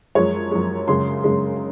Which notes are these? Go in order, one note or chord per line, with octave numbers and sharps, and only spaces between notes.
F#2 F3 G#3 C#5
F#2 F3 G#3
F#2 C#3 G#3 C6
F#2 C#3 G#3